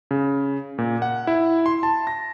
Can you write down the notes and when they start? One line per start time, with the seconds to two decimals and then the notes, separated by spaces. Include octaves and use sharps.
0.11 C#3
0.78 A#2
1.02 F#5
1.27 E4
1.66 C6
1.83 A5
2.07 A#6